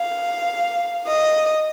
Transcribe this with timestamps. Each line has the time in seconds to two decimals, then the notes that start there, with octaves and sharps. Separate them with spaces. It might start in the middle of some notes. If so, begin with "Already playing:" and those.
Already playing: F5
1.07 D#5